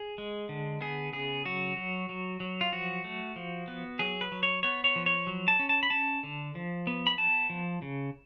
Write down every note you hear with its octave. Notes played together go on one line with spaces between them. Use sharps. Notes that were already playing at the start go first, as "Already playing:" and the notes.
Already playing: G#4
G#3
D3
B3 G#4
C#3 G#4
F#3 F#4
F#3
F#3
F#3
F4
F3 F#4
A3
F3
B3
F#3 G#4
B4
F#3
C#5
B3 C#5
C#5
F3
C#5
F#3
A5
C#4
A5
B5
C#4 A5
D3
F3
B3
B5
B3 A5
F3
C#3